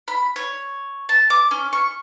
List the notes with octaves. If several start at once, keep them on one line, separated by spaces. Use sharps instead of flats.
B5
C#5
A5
D6
C#4
C#6